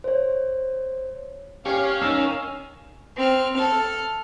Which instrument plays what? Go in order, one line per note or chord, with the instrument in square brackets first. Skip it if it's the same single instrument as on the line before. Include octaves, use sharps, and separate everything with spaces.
[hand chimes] C5 C#5
[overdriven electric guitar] C#4 [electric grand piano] G4 C#5 [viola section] F5
[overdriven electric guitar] D#3 [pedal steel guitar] C#4 [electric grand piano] E6
[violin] C4 F6
A4 F6